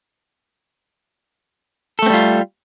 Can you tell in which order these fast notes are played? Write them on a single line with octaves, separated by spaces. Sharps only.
A4 A3 C4 G3 F4